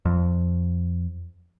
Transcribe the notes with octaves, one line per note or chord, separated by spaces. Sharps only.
F2